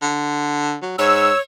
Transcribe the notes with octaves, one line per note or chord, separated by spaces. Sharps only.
D3
F#3
G#2 C#5 E6